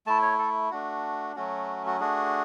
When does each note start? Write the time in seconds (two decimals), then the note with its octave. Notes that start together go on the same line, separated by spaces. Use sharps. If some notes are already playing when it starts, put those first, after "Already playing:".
0.07 A3 E4 A5
0.22 C#5
0.39 A4
0.71 A3 D4 F#4
1.36 F#3 A3 C#4 F#4
1.86 F#4
2.00 A3 D4 F#4 G#4